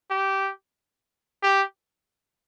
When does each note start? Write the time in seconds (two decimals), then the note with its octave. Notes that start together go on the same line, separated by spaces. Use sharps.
0.11 G4
1.43 G4